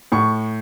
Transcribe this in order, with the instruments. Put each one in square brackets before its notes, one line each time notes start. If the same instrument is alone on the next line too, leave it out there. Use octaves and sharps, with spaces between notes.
[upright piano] A2 C#6